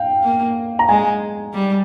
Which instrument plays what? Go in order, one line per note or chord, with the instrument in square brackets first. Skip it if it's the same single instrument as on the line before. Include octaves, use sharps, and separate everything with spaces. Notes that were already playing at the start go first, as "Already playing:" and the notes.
Already playing: [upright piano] F5 G5
[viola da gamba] A#3
[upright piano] A#5
[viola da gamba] G#3 [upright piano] G#5
[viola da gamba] G3